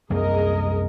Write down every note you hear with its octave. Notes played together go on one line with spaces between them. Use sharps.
C2 F#2 A#3 G#4 A#4 D#5